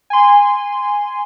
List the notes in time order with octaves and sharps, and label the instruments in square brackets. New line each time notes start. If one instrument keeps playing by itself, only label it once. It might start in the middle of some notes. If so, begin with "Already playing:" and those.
[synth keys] G#5 C6